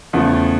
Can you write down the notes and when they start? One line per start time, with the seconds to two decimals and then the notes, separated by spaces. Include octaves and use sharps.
0.13 E2 C#3 F3 A3